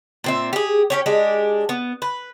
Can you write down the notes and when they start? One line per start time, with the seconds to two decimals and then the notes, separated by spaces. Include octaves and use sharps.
0.24 A#2 C4 E5
0.53 G4 G#4
0.90 C#4 G4 C#5
1.06 G#3 D4 G4
1.69 B3
2.02 B4